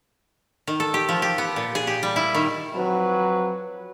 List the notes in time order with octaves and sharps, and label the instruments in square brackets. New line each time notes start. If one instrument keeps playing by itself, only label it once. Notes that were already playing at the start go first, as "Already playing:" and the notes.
[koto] D#3
A4
G4
F3
G4
B3
A#2
G#4
G4
G3
E4
D#3
[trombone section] F3 F#3 C4 F#4 B4